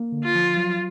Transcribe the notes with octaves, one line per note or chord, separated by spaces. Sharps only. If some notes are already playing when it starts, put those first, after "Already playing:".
Already playing: A#3
D3
F4
F3
F#3